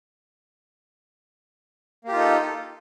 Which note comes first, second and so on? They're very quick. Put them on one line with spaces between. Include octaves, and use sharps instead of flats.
A#3 G4 F4 D#4 A4